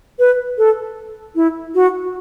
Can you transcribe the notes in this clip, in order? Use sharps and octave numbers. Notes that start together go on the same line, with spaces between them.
B4
A4
E4
F#4